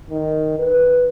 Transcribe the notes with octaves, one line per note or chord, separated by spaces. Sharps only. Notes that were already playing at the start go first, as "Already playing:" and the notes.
D#3
B4